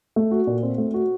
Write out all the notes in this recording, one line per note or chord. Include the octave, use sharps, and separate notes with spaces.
A3
F#4
A#2
C4
A3
F#4